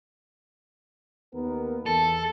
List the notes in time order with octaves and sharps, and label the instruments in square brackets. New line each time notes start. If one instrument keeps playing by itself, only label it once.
[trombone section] D#2 B3 A#4
[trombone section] E2 [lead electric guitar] A4 [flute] A5